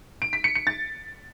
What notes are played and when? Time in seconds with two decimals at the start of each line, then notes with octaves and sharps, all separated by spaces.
0.22 D7
0.33 B6
0.44 C#7
0.55 C#7
0.67 A6